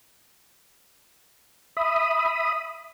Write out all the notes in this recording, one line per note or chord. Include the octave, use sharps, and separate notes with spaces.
E5 B5 D#6